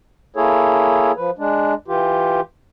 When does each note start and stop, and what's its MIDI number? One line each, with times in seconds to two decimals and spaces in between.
0.36 1.12 58
0.36 1.12 64
0.36 1.12 68
0.36 1.12 69
0.36 1.12 73
1.16 1.31 53
1.16 1.31 71
1.38 1.74 56
1.38 1.74 62
1.88 2.41 52
1.88 2.41 65
1.88 2.41 67